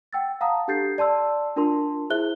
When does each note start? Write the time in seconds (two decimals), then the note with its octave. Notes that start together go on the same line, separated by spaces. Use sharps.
0.13 F#5 G5 E6 A6
0.41 F5 F#5 A5 A#5 D#6
0.68 D4 G4 A4 G6 A6 C7
0.98 D5 A5 C6 E6
1.56 D4 F4 A#4 A5 C6
2.10 E4 G#4 C5 E5 F#6 G7